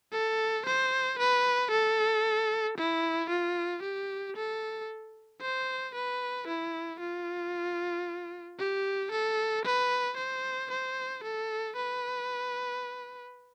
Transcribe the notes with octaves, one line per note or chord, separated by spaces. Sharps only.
A4
C5
B4
A4
E4
F4
G4
A4
C5
B4
E4
F4
G4
A4
B4
C5
C5
A4
B4